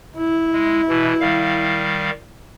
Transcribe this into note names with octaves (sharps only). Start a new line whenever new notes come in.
E4
G#3
B2 E3
D#3 G3 F5